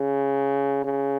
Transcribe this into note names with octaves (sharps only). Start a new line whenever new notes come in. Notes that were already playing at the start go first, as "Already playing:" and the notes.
Already playing: C#3
C#3